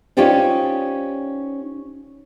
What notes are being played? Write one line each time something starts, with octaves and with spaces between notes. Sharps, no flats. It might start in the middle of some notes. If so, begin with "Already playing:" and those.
C#4 D#4 F4 G4 C5 D5